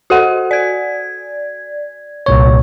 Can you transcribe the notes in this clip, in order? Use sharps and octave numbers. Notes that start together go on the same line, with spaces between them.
F#4 A4 F#5
D5 G#6
C2 A#2 C#5